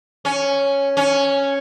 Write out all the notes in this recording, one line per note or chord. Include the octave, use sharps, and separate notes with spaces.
C#4
C#4